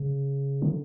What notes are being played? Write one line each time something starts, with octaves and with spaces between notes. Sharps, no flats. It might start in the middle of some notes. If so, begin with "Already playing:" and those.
Already playing: C#3
D3